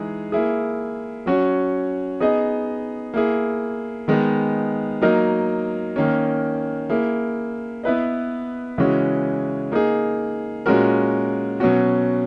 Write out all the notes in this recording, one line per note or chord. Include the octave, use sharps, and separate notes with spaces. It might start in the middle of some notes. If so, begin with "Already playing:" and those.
Already playing: E3 G#3 D#4 G#4
A#3 E4 G#4
F#3 C#4 F#4 C#5
B3 D#4 G#4 D#5
A#3 E4 G#4
D#3 G#3 B3 D#4
F#3 A#3 D#4 A#4 D#5
D#3 A#3 C#4
A#3 E4 G#4
B3 E4 B4 D#5
C#3 E3 G#3 C#4 F#4
A#3 D#4 G#4
A#2 G#3 C#4 F#4 A#4
B2 F#3 C#4 F#4